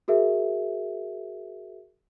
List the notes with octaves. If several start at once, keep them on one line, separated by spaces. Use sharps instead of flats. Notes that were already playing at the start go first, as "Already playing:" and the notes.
F#4 G#4 A#4 E5